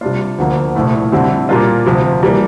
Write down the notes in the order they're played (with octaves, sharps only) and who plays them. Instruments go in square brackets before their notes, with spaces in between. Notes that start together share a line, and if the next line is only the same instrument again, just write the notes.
[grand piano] C3 G3 D4 F4
D2 D3 F3 A#3
C2 A#2 F3 A3 E4
F2 D3 G3 C4 E4
A#2 G3 A#3 D4 F4
D2 C3 F3
E3 G3 A#3